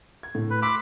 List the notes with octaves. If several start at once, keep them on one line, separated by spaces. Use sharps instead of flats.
G#6
A2
B4
B5 C6 D6 E6